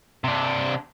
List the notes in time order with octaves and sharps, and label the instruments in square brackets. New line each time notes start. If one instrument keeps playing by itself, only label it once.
[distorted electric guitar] C3 D4